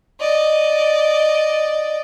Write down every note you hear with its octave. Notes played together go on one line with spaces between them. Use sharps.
D5 D#5